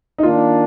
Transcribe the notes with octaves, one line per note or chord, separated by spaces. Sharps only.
D#4
D#3 A#3 D4 F4